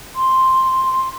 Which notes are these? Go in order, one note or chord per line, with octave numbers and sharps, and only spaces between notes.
C6